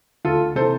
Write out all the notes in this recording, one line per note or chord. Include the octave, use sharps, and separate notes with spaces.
D2 F4 A4
C3 E3 A4 C5